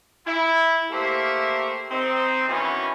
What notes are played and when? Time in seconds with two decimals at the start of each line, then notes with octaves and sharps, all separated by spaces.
0.26 E4
0.91 A3 A#3 G4 C5 E5
1.91 C4 D#4
2.48 B2 D#3 E3 B3 C#4